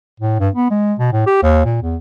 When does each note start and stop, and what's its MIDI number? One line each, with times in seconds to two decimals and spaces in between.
0.20 0.36 45
0.40 0.49 43
0.55 0.70 59
0.71 0.94 56
0.99 1.09 47
1.12 1.25 45
1.27 1.41 67
1.42 1.64 39
1.65 1.80 46
1.82 1.96 40